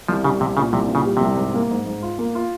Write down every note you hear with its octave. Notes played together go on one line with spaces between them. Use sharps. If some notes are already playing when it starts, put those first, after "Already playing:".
C2 F3
C#3 G3
C2 C3
A#2 C#3
C2 C3
A#2
C#3
G3
C2 C3
G#2
A#3
G#2
G#2
F4
A#3
F4